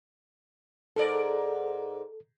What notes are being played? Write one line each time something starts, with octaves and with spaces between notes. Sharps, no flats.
G#2 A4 A#4 D5